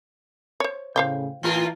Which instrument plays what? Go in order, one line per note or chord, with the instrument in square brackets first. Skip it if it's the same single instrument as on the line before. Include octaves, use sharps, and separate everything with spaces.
[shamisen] C5 C#5
[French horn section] A2 C#3 [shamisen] C5 F5 G5
[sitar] A2 F4 A#4 [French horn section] E3